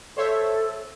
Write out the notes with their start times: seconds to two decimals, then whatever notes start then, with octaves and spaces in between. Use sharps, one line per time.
0.17 A4 C5 C#5 E5